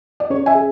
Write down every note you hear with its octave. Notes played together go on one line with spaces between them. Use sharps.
D5
C#4 C#5
E5 G#5
G#4